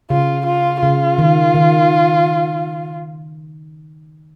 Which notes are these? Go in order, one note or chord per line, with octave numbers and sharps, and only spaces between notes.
C#3 F4
F4
C#3 F4
D#3
D#3